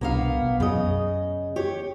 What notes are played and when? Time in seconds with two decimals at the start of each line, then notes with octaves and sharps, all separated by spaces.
0.01 C2 B2 A#3 B3 D4 F5
0.41 B1
0.60 F#2 C#3 D#5
1.56 G4 C#5